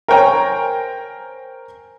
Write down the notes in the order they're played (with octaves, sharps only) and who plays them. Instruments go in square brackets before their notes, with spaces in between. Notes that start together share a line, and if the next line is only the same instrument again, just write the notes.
[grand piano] A#4 C5 C#5 G5 G#5 A#5